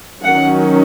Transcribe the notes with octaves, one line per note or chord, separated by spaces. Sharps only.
D#3 F#3 C#4 F#5